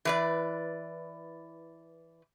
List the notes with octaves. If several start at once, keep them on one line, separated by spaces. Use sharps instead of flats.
E3 B4 D5